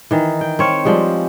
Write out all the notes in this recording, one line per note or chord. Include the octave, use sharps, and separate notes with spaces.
D#3 E3
G5
C4 C#5 F5
F3 G3 G#3